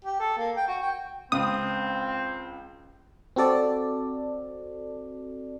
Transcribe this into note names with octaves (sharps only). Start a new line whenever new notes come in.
G4
A4
A#3
G5
F#4
G5
C#2 C4 D#6
C4 F#4 A4 D5